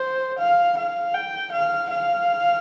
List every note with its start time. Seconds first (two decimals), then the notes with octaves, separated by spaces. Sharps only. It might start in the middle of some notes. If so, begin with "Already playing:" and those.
Already playing: C5
0.39 F5
0.77 F5
1.14 G5
1.52 F5
1.90 F5